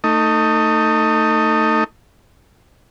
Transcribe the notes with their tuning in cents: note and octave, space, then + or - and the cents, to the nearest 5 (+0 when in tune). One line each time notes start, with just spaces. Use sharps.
A3 +25 D#4 +0